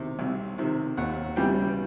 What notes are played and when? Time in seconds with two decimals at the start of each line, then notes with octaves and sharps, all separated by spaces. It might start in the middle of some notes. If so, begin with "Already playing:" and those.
Already playing: C3 D#3
0.19 C2
0.58 C3 D#3
0.97 D#2 F#5
1.36 C#3 E3 G3 G5